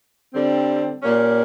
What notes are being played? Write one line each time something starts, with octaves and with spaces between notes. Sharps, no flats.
D3 G3 C4
A#2 G3 A#3 C#4